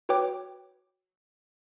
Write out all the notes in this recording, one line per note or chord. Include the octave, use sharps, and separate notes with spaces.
F#4 B4 C#5 G5 D6